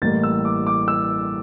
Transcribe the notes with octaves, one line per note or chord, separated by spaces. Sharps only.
A1 A2 G3 A#3 A6
E6
D6
D6
E6